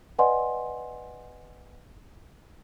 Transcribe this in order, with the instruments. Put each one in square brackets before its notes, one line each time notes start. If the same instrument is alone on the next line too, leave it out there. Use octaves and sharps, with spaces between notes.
[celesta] B4 D5 D#5 F#5 G#5 C6